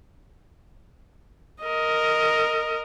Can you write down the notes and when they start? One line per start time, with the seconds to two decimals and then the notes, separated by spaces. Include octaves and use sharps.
1.63 A#4 D#5